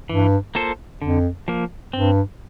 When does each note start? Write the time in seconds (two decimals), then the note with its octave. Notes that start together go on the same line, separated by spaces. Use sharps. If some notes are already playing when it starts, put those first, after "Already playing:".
0.09 G2 E3
0.55 A#3 F4 A4 C5
1.01 F2 D3
1.48 F3 A#3
1.93 G2 C4